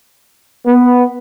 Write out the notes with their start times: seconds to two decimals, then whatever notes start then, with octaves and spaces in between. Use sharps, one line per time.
0.66 B3